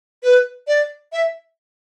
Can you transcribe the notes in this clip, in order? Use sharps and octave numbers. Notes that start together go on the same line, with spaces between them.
B4
D5
E5